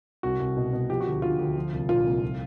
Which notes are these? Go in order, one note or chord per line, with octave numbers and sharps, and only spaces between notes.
C2 F#4
C2
B2
B2
F3 G4
F#4
D2
D3 F4
D2
F3
C2
A#2 F4
C2
F3